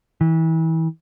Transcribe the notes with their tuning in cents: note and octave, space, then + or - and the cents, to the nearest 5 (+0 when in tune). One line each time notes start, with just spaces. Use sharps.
E3 -30